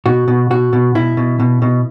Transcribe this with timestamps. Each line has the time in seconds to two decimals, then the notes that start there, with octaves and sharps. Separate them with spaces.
0.06 B2 F#4
0.28 B2
0.50 B2 F#4
0.73 B2
0.95 B2 E4
1.17 B2
1.40 B2
1.62 B2